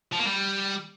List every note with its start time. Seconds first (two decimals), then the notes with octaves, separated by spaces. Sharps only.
0.12 F3
0.19 A#3
0.26 G3